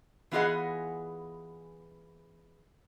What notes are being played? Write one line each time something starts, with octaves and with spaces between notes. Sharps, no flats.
E3 B3 F4 G#4 D#5 F#5